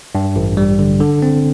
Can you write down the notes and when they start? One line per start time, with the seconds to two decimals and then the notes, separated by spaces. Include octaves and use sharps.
0.15 G2
0.36 A1
0.57 G3
0.79 D3
1.00 D3
1.22 C4